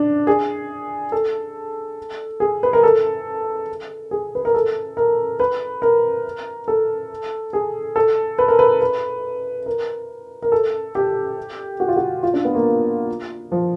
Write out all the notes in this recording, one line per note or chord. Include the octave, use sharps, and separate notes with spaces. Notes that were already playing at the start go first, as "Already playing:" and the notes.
Already playing: D4
G#4
A4
G#4
B4
A#4
A4
G#4
B4
A#4
A4
A#4
B4
A#4
A4
G#4
A4
B4
A#4
B4
B4
A#4
A#4
A4
G4
F#4
F4
F#4
F4
D4
B3
A#3
F3